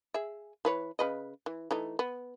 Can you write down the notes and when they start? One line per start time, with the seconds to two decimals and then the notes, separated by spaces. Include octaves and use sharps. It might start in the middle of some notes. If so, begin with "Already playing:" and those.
0.14 G#4 E5
0.65 E3 B4 C#5
0.99 C#3 B4 D#5
1.46 E3
1.71 E3 A3 D#4
1.99 B3